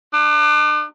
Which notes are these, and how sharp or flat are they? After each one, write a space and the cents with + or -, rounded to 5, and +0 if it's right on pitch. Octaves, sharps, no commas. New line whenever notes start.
D4 +35